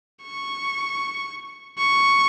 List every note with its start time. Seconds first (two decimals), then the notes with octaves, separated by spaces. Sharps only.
0.22 C#6
1.78 C#6